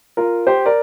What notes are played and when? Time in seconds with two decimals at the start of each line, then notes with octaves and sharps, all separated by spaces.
0.17 F4 A#4
0.47 G4 C5
0.66 A#4 D5